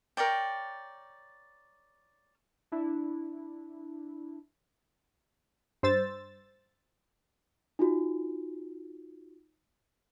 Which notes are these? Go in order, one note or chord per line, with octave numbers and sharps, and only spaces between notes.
A#4 C#5 D5 G5
D4 E4
G2 C5 E6 A6
D#4 F4 F#4